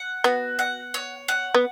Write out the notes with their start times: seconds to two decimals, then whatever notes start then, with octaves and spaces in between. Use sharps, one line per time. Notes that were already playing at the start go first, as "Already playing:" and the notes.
Already playing: F#5
0.24 B3 F#4
0.59 F#5
0.94 C#5
1.28 F#5
1.54 B3